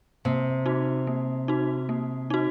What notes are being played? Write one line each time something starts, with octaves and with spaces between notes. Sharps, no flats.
C3 A#3
D#4 F#4
A#3
D#4 F#4
A#3
D#4 F#4